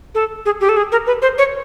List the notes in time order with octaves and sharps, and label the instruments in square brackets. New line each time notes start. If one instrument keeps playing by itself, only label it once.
[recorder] A4
G#4
G4
A4
G#4
A#4
B4
C5
C#5